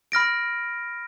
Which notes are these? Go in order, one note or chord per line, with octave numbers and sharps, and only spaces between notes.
B5 F6 A#6 D7